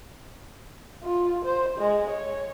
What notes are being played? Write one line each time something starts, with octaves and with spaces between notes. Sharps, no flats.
F4
C5
G#3
C#5